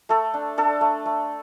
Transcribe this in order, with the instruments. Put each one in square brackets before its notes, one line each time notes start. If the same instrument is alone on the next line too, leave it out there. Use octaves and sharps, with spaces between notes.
[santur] A3 A4
D4
D4 A4
A3
A3